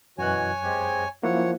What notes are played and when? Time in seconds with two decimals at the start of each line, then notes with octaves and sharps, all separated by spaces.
0.18 F#2 B2 E3 F#4 C#5 G#5 F#6
0.63 G#3 C4 G4
1.23 F#2 F3 A#3 E4 C#5 F#5